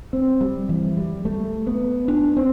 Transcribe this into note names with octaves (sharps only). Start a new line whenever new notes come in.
C4
G3
E3
G3
A3
B3
D4
C4